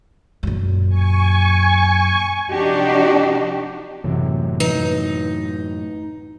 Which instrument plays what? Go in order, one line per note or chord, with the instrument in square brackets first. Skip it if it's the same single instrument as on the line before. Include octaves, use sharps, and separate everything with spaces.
[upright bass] F#2 A#2
[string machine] G#5 C#6
[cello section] C3 F3 D4 D#4 F#4 G4
[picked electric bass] F#2 A2 [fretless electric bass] C3 E3
[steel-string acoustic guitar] D#4 [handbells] B4